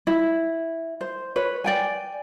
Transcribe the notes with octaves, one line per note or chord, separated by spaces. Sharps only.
E4
C5
B4 C#5
D5 G5 G#5